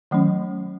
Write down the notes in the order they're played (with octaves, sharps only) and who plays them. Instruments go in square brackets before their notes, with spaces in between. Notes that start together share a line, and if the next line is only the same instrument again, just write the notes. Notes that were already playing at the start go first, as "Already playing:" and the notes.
[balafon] D#3 F#3 A3 C#4